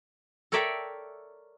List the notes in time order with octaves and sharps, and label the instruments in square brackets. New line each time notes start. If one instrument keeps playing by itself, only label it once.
[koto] A4 A#4 C#5 D5 E5 G5